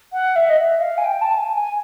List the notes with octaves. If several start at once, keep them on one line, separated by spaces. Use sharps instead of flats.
F#5
E5
D#5
E5
F5
G#5
G5
A5
G#5
G#5